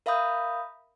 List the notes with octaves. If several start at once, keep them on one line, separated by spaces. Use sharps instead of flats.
A#4 E5 F5 B5 D#6 G6